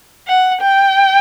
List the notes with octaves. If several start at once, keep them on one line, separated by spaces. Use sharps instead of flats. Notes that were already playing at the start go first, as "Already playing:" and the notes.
F#5
G5